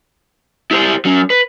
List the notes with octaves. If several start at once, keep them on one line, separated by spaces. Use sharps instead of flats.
E4 G4 A#4 C5
F#3 C#4
B4